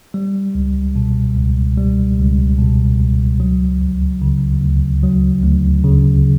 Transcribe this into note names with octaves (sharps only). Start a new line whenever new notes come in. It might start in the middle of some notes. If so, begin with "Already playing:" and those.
G3
C#2
B2
C#2
G3
C#2
B2
C#2
F#3
D2
C#3
D2
F#3
D2
C#3